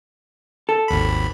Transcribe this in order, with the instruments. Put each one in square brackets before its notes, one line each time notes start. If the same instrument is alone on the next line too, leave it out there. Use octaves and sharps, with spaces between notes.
[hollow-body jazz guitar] A4
[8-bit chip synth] G#1 D#2 B5